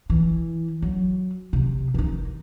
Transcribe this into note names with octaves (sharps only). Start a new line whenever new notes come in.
E3
F#3
C3
D#3 D#4